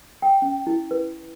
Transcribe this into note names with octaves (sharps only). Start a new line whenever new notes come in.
G5
C#4
E4
B4